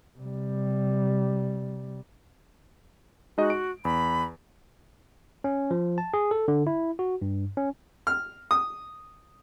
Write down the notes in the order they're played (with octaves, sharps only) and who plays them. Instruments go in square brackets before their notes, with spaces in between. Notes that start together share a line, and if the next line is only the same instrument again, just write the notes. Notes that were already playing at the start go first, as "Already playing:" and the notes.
[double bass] C3 G3
[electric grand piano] G#3 D#4 D#5 [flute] F#4
[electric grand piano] D7
[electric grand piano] E2 [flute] B5
[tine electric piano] C#4
F3
A5
G#4
A4
D3
E4
F#4
G2
C#4
[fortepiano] F6
D#6